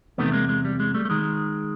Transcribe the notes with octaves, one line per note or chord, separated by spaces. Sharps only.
E2 C3 D#3 A3 B3
G#3 A#3
G#3
G3
G#3
G3 A3
A3
D#3 G#3